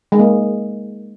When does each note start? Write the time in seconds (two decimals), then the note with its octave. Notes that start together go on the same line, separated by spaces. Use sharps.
0.12 G#3
0.19 A#3